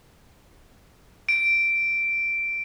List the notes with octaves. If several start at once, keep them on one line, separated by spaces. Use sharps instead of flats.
D7